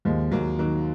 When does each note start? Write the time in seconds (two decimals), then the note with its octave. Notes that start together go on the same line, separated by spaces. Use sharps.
0.05 D#2 F3 G#3
0.31 D#2 F#3 A#3
0.58 D#3 F#3 A#3